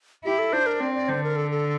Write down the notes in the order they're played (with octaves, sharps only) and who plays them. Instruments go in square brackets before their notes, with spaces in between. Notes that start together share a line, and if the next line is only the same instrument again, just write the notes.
[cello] E4 [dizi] G4
[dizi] A4
[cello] D4 [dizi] C5
[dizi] A#4
[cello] C4 [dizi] D5
[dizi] D5
[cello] D3 [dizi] C5
[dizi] A#4
A4
A4